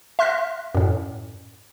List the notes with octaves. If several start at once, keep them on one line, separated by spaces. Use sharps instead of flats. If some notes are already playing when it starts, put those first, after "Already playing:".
E5 C6 F6 F#6 A#6 B6
F#2 A2